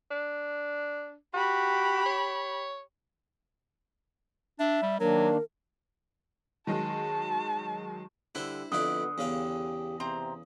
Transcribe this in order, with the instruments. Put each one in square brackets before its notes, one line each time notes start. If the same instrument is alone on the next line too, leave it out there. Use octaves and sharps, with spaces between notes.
[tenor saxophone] D4
[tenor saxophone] F#4 [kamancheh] G4 B5
[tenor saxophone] C#5
[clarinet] D4 [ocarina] E5
[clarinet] G3
[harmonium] D#3 A#3 D4 [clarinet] F#3 [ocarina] A#4
[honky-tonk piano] D#3 F#3 G#3 [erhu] A5
[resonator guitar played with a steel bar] D3 [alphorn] G3 [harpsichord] E4 C5
[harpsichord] F2 E4 D5 [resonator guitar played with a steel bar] D3 [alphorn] B3 [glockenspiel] D#6
[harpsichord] E2 C#3 F5 [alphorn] G4
[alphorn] C3 [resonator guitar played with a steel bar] C4 C5 A#5